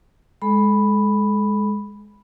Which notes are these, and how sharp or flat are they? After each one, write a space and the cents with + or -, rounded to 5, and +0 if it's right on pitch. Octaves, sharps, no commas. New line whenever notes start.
G#3 -5 A4 -25 B5 +0